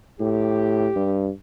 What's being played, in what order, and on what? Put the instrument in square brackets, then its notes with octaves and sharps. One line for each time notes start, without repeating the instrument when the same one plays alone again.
[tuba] A2 [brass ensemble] G4
[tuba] G2